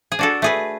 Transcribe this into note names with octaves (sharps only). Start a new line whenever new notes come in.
G#4
D4 F#4 A4
A3 G#4 B4